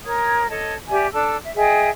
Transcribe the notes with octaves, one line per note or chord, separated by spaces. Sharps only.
A#4 C#5 D#6 G#6
A4 C#5 D#5 A5
G4 D5 E5 G#5
D4 A4 A5 E6
E5
G#4 D#5 E5 G5